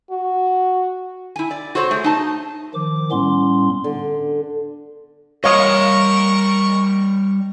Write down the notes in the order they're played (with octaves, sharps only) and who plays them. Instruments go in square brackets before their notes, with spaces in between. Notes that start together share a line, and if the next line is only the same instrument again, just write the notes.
[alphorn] F#4
[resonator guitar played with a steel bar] E4 G#5
D5
F#4 A4 C5 C#5
A3 G#4
D#4 A5
[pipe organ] D#3 F3 D6
A2 G3 B3 C#4 C6
[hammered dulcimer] D3
[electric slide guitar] G3 D#5 [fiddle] A#4 C#6 [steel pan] C#5 F5 D#6